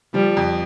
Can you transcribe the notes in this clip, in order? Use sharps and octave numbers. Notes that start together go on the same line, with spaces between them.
F3 G3
F2